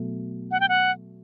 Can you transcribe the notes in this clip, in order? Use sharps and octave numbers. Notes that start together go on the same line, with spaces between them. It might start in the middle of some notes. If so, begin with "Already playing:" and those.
Already playing: B2 F#3 A3
F#5
G5
F#5